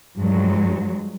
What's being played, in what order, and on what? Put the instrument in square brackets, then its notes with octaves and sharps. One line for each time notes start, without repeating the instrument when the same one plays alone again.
[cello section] G2 F3 F#3 G#3